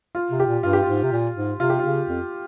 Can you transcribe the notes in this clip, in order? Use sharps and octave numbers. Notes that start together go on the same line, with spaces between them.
F4
C3
G4
A#2
G2 F4
G4
F4
G#2
C3
A#2
G#2
C3 F4
G4
C#3 F4
F2